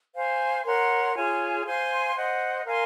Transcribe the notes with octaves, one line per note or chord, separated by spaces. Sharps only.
C5 F5 G#5
A#4 C#5 F#5 C6
F4 G#4 C#5 G#5
C5 F5 G#5 C6
C5 D#5 F#5
A#4 F5 G#5 C6